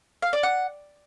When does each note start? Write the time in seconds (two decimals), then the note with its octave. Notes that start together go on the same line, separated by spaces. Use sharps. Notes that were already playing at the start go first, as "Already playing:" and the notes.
0.22 F5
0.33 D5
0.43 F#5